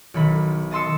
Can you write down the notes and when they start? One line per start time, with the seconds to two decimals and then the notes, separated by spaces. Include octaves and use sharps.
0.14 B1 D#3 B5
0.71 D#5 A5 C6 E6 C#7